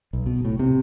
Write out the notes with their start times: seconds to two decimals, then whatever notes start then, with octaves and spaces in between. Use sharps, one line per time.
0.13 B1
0.26 B2
0.45 A2
0.59 C3